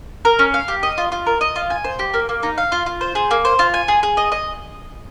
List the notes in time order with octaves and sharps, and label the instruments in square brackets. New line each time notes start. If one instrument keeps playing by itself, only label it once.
[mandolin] A#4
C#4
F5
G4
D#5
F4
F4
A#4
D#5
F4
G#5
C5
G4
A#3
A#3
D#4
F5
F4
F4
C5
G#4
A#3
C5
F4
G#5
G#4
G#4
D#5
D#5